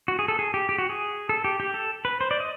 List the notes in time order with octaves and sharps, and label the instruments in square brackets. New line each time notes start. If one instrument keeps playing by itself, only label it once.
[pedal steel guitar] F#4
G#4
A4
G#4
G4
G4
F#4
G#4
A4
G4
G4
A4
B4
C5
D5
D#5